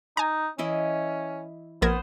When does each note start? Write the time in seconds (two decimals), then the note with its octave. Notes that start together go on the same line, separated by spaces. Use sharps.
0.17 D#4 G#5 A#5
0.58 E3 C#4 E4 D#5
1.82 A#1 B3 A#4 C5 G#6